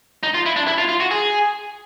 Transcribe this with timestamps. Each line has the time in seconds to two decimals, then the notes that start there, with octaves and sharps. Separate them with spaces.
0.23 D#4
0.34 F4
0.46 E4
0.56 D4
0.67 E4
0.78 F4
0.89 F4
1.00 F#4
1.11 G#4